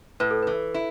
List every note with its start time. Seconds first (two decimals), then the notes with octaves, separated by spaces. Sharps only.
0.20 A2 B4
0.31 A4
0.43 E3 B4
0.74 E4